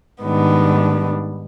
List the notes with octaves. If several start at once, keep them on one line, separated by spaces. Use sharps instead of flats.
G#2 D#3 G3 B3 D4